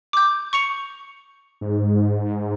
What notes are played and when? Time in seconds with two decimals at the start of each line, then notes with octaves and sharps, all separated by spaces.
0.13 D6 G6
0.53 C#6 C#7 F7
1.61 G#2